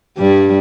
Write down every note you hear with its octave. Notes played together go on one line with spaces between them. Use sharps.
G2 G3